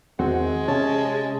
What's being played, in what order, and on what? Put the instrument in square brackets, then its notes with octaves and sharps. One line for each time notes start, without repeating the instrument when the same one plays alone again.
[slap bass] E2 D#3 [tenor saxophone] G#3 [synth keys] C4 F#4
[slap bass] C3 [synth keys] C#4 [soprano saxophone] A5